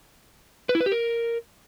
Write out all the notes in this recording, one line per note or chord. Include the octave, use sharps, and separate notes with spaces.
B4
E4
B4
G4
A#4